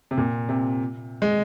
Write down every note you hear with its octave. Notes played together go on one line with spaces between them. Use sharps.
C3
A#2
C3
G#3